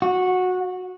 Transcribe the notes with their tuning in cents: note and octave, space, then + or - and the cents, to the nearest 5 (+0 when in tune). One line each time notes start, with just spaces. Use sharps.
F#4 -15